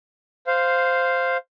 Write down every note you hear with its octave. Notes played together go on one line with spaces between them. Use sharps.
C5 F5